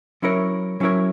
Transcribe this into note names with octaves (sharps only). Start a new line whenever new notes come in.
F#3 C#4 E4 A#4 C#5
F#3 C#4 E4 A#4 C#5